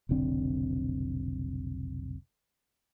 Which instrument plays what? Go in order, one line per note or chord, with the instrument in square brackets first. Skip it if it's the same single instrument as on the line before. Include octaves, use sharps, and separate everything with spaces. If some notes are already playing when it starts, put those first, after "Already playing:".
[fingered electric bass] F1 B1 D3 C4